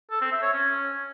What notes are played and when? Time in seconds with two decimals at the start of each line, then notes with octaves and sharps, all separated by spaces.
0.11 A4
0.21 C4
0.32 E5
0.42 C#5
0.53 C#4